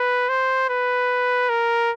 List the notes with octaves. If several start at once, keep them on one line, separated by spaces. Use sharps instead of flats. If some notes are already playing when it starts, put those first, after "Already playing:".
Already playing: B4
C5
B4
A#4